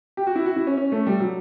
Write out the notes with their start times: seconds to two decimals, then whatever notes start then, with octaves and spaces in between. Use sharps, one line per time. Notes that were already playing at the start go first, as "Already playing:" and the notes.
0.17 G4
0.27 F#4
0.35 E4
0.46 F#4
0.56 E4
0.67 C#4
0.77 C#4
0.92 A3
1.07 G3
1.20 F#3